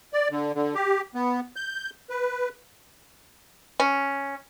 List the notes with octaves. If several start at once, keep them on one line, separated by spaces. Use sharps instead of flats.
D5
D3
D3
G4
B3
G6
B4
C#4